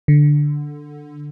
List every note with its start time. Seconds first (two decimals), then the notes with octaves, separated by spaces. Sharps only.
0.08 D3